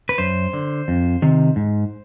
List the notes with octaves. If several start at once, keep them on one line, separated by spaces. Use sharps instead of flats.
B4
F#2 C5
D3
F2
C3 D#3
G#2